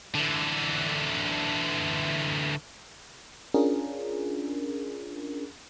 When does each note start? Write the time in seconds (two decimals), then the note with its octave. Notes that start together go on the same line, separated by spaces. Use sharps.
0.15 D3 E3
3.54 C#4 D4 F4 G#4 A#4